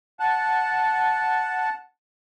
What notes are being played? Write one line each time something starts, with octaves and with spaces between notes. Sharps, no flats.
F#5 A5